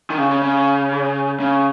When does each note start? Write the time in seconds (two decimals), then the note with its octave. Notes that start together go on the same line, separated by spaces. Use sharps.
0.10 D#3
0.18 C#3
0.30 C#3
0.42 C#3
1.40 C#3